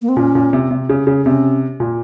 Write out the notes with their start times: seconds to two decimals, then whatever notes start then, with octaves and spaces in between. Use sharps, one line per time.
0.02 A#3
0.09 C4
0.16 A#2 C#4
0.35 A#2
0.53 C3
0.71 C3
0.89 C#3
1.07 C#3
1.25 C3 C#4
1.80 A#2